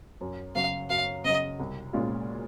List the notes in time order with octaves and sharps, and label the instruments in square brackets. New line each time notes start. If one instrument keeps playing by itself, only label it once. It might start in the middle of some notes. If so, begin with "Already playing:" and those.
[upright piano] F#2
[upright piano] C#3 F#3 [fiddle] F5
[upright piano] F#2 [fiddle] F5
[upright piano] C#3 F#3 [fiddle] D#5
[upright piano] C2
A#2 G#3 C#4 F4